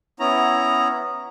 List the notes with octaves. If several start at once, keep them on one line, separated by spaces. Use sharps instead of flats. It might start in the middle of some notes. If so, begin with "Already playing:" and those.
B3 C#4 E4 A#5